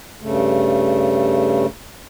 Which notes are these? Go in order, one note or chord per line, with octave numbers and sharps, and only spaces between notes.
G2 C#3 A3